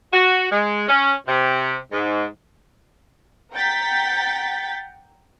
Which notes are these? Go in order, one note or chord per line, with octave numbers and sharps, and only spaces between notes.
F#4
G#3
C#4
C3
G#2
F#5 G5 A#5 G6 A6 B6